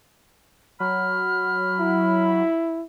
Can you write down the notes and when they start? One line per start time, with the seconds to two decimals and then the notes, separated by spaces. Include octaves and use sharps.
0.80 F#3 B5 F6
1.80 E4